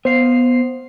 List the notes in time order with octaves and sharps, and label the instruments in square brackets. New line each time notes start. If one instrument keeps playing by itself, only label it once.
[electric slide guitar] B3 F5 [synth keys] C5 C7